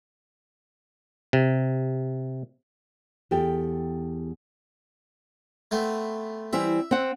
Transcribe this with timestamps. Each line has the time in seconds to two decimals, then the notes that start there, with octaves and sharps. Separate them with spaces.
1.33 C3
3.31 E2 G4 A4 G5
5.71 A3 B3 C4
6.53 E3 G3 C4 E5
6.91 C4 F#5